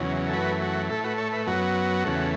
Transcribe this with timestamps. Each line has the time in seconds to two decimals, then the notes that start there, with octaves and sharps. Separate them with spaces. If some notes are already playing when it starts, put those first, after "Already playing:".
Already playing: E2 C#3 F#3
0.28 A4
0.33 F#2 E3 A3 F#4 B4
0.62 F#4
0.89 A2 A3 E4 A4
1.04 F#4 B4
1.18 A4 C#5
1.32 B4 E5
1.47 F#2 F#3 B3 F#4
2.04 E2 C#3 A3